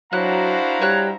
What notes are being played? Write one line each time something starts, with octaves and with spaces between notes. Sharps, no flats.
F#3 D4 E4 F#4 C5 F5 A#5 F#6
G3 C#5 F#6